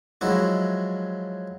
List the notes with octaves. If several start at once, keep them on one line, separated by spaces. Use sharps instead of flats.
F3 F#3 G#3 E4 F#4